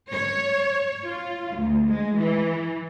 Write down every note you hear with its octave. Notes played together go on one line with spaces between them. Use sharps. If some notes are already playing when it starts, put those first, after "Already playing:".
C#5
F4
D2
G#3
E3